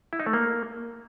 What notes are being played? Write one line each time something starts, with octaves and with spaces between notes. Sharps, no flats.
E4
D#4
A3
A#3